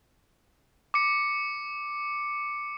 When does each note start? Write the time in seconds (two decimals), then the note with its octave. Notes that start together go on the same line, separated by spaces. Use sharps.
0.94 D6 C#7